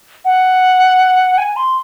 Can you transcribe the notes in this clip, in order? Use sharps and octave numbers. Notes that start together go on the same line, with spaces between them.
F#5
G#5
C6